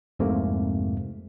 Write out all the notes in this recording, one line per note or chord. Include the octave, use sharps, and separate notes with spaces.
C2 F2 G#2 C3 A3 A#3